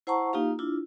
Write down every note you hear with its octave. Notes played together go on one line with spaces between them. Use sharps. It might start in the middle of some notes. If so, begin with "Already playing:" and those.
E4 C5 F#5 A5 A#5 C#6
A#3 D#4 F4 G4 F5
D4 E4 F4